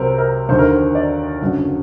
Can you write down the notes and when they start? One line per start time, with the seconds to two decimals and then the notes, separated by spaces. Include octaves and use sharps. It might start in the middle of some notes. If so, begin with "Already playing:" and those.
Already playing: C2 C3 F#3 A#4 C5
0.18 A#4
0.49 D#2 D3 F#3 C5
0.59 A#4
0.68 C5
0.95 D5
1.41 F#1 F#2 D3 F#3